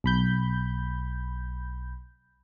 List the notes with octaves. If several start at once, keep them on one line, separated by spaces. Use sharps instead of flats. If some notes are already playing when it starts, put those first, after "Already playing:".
B1 B5 G6